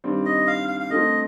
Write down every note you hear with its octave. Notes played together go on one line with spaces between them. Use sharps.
G2 D#3 G3 C4
D#5
F5
F5
F5
D3 A3 C4 F4 D#5